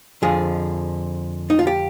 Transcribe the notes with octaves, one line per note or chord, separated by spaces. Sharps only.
F2 D3 F3 G#4
D#4
F4
G4